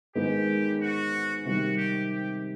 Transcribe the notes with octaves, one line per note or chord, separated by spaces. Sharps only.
G#2 D#3 G#3 B3 G4
F#4
C3 D#3 G3 F#4
G4
G4